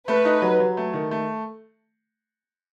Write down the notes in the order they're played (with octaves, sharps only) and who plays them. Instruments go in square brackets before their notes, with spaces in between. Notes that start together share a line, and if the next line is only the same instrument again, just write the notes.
[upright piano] A3 [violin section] B4
[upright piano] D#4
F#3
F#3
A3
D#3
A3